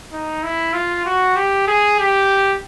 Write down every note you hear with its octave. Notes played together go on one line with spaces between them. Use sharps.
D#4
E4
F4
F#4
G4
G#4
G4